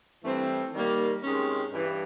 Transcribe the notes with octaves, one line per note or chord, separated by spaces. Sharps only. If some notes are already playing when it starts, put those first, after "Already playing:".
G2 E3 A3 C4
D#3 G3 A#3
C3 D#3 G#3 C#4
G2 E3